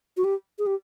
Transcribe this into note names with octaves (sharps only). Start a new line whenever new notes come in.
F#4
G4
G#4
G4